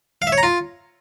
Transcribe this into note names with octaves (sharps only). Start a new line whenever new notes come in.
F5
E5
C#5
A#5
F4